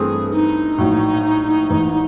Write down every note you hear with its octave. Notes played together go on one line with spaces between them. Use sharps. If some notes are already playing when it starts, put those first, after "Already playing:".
Already playing: G2 E3 A3 C4 E4 G#4
D#4
A#1 A2 F#3
A1 G#2 E3